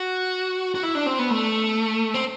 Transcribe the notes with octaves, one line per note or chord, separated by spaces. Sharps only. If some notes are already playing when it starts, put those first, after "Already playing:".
Already playing: F#4
F#4
E4
D4
C4
B3
A3
C4